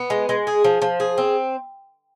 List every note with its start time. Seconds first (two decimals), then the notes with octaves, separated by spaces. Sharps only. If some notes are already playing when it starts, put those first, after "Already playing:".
Already playing: B3
0.10 G#3
0.29 G#3
0.47 G#4
0.64 F3
0.82 F3
1.00 G#4
1.18 C4